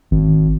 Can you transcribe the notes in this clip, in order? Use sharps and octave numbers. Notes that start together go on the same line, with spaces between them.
G#1